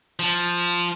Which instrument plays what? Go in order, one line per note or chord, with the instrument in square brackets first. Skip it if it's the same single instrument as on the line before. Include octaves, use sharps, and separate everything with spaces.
[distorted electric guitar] F3